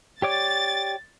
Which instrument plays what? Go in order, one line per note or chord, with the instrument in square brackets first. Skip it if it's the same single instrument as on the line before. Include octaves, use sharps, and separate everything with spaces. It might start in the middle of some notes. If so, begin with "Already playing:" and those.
[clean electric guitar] G4 C#5 D5 [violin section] A6